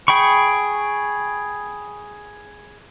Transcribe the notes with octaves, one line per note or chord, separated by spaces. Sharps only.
G#4 G5 B5 C#6